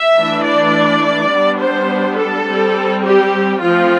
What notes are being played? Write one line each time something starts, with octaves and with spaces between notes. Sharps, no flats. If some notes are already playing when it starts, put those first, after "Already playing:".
Already playing: E5
E3 A3 D4
D5
G3 B3 D4
C5
A4
G3 C4
G4
F3 A3 C4 F4